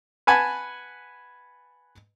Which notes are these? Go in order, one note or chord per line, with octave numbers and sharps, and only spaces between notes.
B4 F#5 G#5 A5 B5